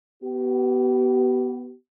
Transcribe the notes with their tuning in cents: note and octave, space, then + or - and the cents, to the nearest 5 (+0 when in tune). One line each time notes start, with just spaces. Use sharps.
B3 +0 G4 -40